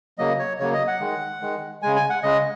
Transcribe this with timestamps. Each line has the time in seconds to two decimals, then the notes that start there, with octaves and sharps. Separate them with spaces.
0.18 C#3 F#3 A#3 D#5
0.39 C#5
0.59 C#3 F#3 A#3 C#5
0.73 D#5
0.87 F#5
1.00 D#3 G#3
1.41 D#3 G#3
1.82 C#3 G#3 G#5
1.96 G#5
2.10 F#5
2.23 C#3 G#3 D#5